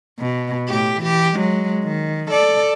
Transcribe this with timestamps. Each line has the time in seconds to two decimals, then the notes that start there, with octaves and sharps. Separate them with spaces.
0.19 B2
0.68 A2 G4
1.00 E3 G4
1.36 F#3 G#3
1.84 D#3
2.31 A4 D5